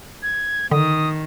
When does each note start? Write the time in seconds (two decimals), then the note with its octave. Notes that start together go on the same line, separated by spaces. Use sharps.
0.23 G#6
0.71 D3 D#3 D#6